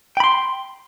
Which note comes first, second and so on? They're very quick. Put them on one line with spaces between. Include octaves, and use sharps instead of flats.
G5 B5 C6